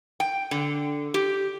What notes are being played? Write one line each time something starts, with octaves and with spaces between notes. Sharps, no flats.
G5
D3
G4